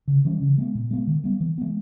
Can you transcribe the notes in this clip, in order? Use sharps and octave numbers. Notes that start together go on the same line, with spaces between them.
C#3
E3 G3 C#4
C#3
G#3 B3
A#2
G#3 B3
D#3
G3 B3
E3
G#3 B3